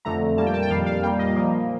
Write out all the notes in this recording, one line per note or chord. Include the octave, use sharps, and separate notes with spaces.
F2 D3 A3 A#5
A#2 G3 A#3 A5
G5
A5
G5
F2 D#3 G3 F5
F5
A#2 G3 A#3 G5
D#5
A#2 F3 A#3